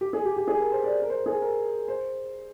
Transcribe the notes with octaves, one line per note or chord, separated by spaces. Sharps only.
G4
G#4
G4
G4
G#4
A#4
C5
D5
A#4
C5
G#4
A#4
C5